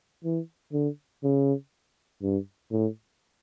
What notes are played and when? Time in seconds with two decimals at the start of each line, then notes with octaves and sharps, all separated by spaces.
0.24 E3
0.73 D3
1.23 C#3
2.22 G2
2.71 A2